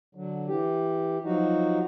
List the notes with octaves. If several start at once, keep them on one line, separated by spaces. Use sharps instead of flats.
D3 F#3
E3 G4
F3 F#3 D#4 F#4